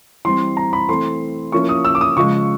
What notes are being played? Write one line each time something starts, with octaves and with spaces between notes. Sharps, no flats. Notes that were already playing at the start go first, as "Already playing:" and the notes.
E3 G3 C4 C6
A#5
B5
E3 A3 C4 C6
F3 A#3 C#4 E4 C#6
D#6
E6
D6
D#6
C#3 F3 G#3 C#6